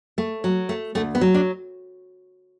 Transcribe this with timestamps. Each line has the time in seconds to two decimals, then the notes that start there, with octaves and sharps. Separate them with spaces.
0.18 A3
0.44 F#3
0.69 A3
0.95 D2 A3
1.15 B3
1.21 F#3
1.34 D4